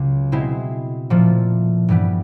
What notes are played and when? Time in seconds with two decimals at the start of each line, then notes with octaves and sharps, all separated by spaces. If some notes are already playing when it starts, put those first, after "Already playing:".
Already playing: C#2 C#3 F#3
0.32 B2 G#3 C4 E4
1.10 A#2 F3 A3
1.88 G2 E3 G3 B3